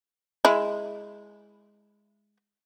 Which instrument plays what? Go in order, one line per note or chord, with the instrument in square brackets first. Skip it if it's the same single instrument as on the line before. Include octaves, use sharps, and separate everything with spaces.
[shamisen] G#3 E4